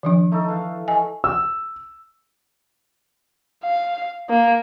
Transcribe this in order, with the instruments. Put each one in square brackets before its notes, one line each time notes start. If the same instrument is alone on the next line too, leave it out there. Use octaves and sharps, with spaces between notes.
[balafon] D#3 F3 D4
[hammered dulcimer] A3 D#4 A4
E3 F5
[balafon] D#5 G#5
[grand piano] E6
[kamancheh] F5
A#3